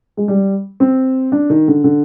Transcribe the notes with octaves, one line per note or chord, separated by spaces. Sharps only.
G#3
G3
C4
D4
D#3
D3
D3